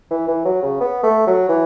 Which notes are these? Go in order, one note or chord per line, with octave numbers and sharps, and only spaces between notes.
E3
E3
F#3
C#3
B3
A3
F#3
E3